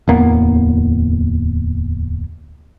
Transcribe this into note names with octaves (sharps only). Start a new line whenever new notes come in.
D1 E2 A#3 B3